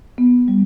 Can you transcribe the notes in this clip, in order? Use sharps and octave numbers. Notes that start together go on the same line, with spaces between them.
B3
G3